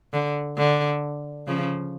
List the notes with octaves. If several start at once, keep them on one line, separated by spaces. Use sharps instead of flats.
D3
D3
C#3 F3